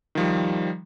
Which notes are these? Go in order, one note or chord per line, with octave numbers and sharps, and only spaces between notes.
D#3 F3 G3